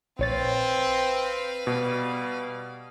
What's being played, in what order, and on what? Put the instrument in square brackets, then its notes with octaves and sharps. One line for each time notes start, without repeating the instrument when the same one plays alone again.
[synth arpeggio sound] A#1 C#5 A6 [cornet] C4 [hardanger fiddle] B4 F5
[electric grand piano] B2 [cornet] G3